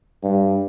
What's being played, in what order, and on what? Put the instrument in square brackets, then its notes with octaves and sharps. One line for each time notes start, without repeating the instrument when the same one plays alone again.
[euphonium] G2